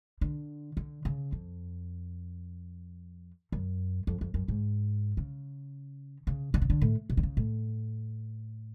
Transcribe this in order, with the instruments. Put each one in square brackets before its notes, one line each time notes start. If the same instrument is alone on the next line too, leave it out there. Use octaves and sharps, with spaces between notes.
[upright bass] D3
D3
C#3
F2
F#2
F2
F2
F#2
G#2
C#3
C#3
D3
C#3
D3
A2
B2
D3
C#3
A2